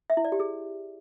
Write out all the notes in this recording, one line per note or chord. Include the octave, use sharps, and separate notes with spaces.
E5
E4
D5
G4
G#4